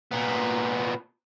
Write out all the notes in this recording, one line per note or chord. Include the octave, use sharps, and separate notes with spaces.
A#2 B3